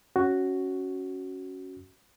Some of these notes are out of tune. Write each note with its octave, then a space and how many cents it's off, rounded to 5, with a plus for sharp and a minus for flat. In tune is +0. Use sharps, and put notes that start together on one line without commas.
C#4 +0 F#4 +5